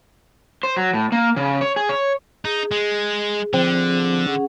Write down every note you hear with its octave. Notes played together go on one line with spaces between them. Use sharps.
C5
F#3
A2
A#3
C#3
C#5
G#4
C#5
D#4 G#4
G#3
D3 F3 C4
C#4 G#4 F#5